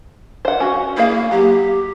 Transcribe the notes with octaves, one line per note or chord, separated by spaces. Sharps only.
C5 F#5
C#4 F#4
A#3 E4 G#4 F5
F#3 G4